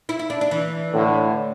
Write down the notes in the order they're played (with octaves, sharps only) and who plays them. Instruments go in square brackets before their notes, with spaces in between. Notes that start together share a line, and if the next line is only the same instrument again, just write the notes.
[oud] E4
E4
D4
D4
E3
[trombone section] A2 D3